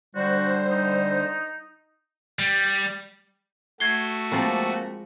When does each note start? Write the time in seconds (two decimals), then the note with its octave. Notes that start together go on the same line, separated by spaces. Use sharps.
0.16 D3 G3 F#4 C5
0.70 D#4
2.39 G3
3.80 A3 F#4 G#6 C7 G7
4.32 F3 G#3 A#3 C4 D5